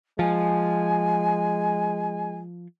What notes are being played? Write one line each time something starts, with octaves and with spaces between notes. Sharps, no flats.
F3 G#3 G#5